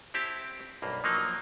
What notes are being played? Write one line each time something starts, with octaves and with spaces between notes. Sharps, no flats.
C4 E4 G4 A5
B1 G2 A#3
F3 F#3 A#3 D#4